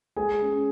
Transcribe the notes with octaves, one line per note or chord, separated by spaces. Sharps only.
G#3 G#4 G#5
C#4